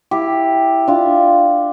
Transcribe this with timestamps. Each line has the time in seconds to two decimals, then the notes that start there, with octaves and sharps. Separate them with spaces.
0.11 E4 G4
0.88 D4 F4